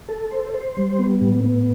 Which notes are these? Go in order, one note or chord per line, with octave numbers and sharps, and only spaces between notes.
A4
C5
C5
G3
B3
A2
B3